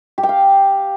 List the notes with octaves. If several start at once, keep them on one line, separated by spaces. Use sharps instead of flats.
G4
G5
F5